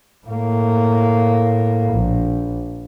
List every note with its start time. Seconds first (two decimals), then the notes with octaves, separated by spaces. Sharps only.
0.27 A2 A#3
1.93 A#1